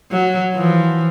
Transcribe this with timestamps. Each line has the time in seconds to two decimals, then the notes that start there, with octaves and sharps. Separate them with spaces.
0.11 F#3
0.54 E3 F3